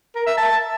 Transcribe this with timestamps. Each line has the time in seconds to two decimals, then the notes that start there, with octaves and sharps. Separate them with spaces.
0.15 A#4
0.26 E5
0.37 A5